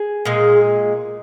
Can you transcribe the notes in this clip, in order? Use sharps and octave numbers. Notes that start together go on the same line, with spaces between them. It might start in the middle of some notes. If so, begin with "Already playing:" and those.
Already playing: G#4
A#2 G#3